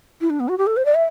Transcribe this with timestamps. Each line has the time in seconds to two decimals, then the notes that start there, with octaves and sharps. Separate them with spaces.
0.21 E4
0.30 D4
0.40 B3
0.49 F#4
0.58 G4
0.67 A4
0.77 C5
0.85 D5
0.95 E5